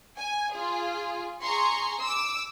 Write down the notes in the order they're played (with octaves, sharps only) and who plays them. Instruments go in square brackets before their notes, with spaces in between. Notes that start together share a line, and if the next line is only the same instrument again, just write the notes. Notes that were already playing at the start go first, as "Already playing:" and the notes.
[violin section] G#5
F4 G#4
G#4 A#5 C6 C#6
D6 E6